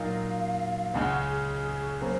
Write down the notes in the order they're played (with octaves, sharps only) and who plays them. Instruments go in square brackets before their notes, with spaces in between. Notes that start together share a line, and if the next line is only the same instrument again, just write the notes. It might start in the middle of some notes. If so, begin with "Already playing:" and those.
Already playing: [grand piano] A#2 F#3 A#3 D#4 [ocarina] F5
[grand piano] C#2 C#3 G#3 C#4 [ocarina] F#5
[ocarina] G#4
[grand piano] C#3 F#3 A#3 C#4 [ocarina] C5